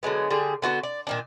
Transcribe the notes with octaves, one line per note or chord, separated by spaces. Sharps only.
D3 F#3 G#3 B3
D3 G3 G#4
D3 B3 F#4 A4
D5
A#2 D#3 D4